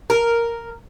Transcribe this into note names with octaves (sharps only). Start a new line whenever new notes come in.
A#4